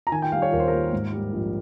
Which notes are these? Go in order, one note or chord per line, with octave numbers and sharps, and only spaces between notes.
A#5
D#3 G#5
G5
G3 F5
C#5
D#2 A#4
C5
A#3 A#4
G#2
G3
A#1